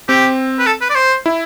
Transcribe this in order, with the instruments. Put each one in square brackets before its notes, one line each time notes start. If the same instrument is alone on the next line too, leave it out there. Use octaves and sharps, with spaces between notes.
[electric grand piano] C4 [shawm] G4
[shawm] B4
A4
B4
D5
C5
[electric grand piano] E4